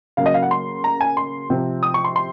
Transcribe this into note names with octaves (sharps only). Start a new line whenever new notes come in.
C#3 F#3 A#3 F5
D#5
F5
F#5
C6
A#5
G#5
C6
C3 F3 C4
D#6
C#6
C6
C6